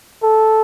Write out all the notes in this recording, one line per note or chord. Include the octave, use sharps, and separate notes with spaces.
A4